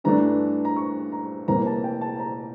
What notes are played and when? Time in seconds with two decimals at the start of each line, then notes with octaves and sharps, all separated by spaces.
0.04 G2 E3 A3 D4 A#5
0.65 A#5
0.76 C#6
1.12 A#5
1.48 F1 F2 E3 A#3 A#5
1.66 A5
1.84 G5
2.01 A5
2.16 A5
2.19 A#5